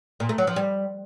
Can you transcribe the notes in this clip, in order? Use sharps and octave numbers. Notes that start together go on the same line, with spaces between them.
A#2
A3
F#3
F3
G3